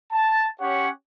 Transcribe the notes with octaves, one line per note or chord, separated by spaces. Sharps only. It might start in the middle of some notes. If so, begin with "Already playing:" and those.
A5
C#4 G4 C#5 F#5